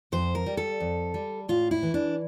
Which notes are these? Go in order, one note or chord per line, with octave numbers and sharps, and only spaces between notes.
F2 C5
A#4
G3
A4
F2
G3
A2 F4
E4
E3
D4